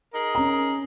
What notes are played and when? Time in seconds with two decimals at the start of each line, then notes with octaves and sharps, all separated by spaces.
0.14 D#4 G#4 A#4
0.35 C#4 A#5